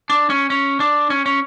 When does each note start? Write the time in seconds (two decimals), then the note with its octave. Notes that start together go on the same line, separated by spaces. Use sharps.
0.10 D4
0.30 C#4
0.50 C#4
0.80 D4
1.10 C#4
1.26 C#4